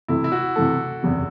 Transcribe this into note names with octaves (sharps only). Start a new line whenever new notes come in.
C3 E3 A3 E4
E4
F#4
C3 E3 A3 A4
F#1 E2 C3